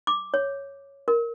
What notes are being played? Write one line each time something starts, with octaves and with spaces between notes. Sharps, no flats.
D6
C#5
A#4